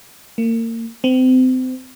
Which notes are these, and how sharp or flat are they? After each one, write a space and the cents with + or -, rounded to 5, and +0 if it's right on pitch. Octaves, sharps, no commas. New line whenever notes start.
A#3 -35
C4 -30